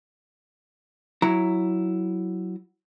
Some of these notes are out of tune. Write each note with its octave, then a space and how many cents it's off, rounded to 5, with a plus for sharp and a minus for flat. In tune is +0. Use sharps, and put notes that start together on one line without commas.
F#3 +0 E4 +0 A#5 +0